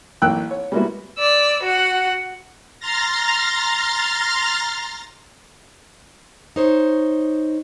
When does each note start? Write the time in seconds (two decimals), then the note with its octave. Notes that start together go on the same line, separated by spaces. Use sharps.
0.22 A1 A#3 G5 E6 F#6
0.51 C#5
0.72 G3 G#3 A#3 B3 E4 F#4
1.18 D5 E6
1.63 F#4 F#5
2.79 A#5 C6 F6 A6 A#6
6.56 D#4 C5 C#5